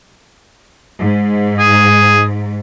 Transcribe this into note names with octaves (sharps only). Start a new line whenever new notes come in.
G#2
G#4